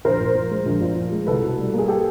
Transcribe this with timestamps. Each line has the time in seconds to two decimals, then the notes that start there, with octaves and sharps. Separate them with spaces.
0.04 A#1 A#4 C5
0.20 A#2
0.35 F3
0.51 G#3
0.65 A#1
0.81 A#2
0.96 F3
1.11 G#3
1.27 C2 A4 B4
1.42 B2
1.59 G3
1.74 A#3 G#4
1.88 G4 A4